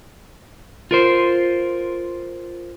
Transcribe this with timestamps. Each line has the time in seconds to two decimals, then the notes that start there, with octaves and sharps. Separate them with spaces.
0.91 F4 A#4 C5